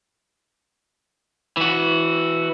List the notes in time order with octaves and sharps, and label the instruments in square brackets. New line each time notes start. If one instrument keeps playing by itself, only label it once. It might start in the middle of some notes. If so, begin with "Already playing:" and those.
[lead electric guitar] E3 F#4